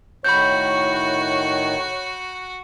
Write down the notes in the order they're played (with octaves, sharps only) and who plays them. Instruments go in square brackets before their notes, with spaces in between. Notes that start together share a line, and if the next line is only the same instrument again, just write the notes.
[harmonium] A2 D#3 [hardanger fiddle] F#4 [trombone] C#5 [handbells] B5 G6